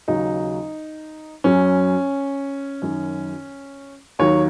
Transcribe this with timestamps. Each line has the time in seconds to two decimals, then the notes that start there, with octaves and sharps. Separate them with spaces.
0.08 D#2 C#3 F#3 D#4
1.44 F#2 F#3 C#4
2.82 F#2 D#3 F#3
4.19 D#2 D#3 F#3 C#5